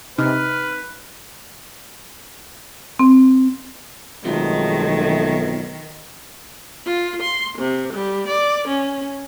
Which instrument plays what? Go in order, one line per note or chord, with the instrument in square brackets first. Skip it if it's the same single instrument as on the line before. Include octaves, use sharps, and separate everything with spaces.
[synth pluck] C3 [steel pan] D#4 [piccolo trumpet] B4 [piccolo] F6
[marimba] C4
[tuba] B1 [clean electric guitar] F2 B2 F3 [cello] D#3 [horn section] G#3 A3
[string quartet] F4
C6
C3
G3
D5
C#4